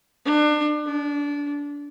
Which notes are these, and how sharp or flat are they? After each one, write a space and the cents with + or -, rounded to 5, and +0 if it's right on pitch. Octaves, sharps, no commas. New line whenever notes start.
D4 +30
D4 -25